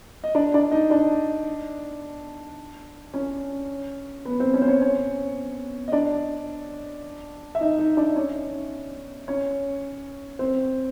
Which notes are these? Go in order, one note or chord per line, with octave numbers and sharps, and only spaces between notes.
D#5
D4 D5
D4 D5
D#4 D#5
D4 D5
C#4 C#5
B3 B4
C4 C5
C#4 C#5
C5
C#4 C#5
C#4 C#5
D#5
D4 D5
E5
D#4 D#5
D#4 D#5
D4 D5
C#4 C#5
C#4 C#5
C4 C5